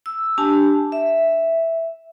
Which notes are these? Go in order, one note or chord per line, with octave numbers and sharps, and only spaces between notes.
E6
D4 G4 G#5 A5
E5